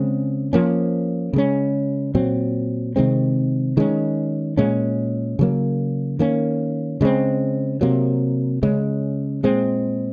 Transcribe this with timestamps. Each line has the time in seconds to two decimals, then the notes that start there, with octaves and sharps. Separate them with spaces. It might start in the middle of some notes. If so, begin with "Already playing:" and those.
Already playing: C#3 G#3 C4
0.53 F3 A#3 C#4
1.33 C#3 G#3 C#4
2.15 A#2 F#3 C4
2.96 C3 D#3 G#3 C4
3.77 D#3 G#3 C#4
4.57 A#2 G#3 C#4
5.39 C#3 F#3 A#3
6.19 D#3 A#3 C#4
7.01 C#3 G#3 C4
7.81 C3 F#3 A#3
8.63 C#3 G#3 C#4
9.43 A#2 G#3 C4